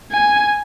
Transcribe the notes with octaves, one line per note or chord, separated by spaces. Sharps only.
G#5